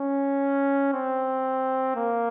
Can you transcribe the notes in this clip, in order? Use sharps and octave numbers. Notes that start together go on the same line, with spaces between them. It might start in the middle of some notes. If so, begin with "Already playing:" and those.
Already playing: C#4
C4
A#3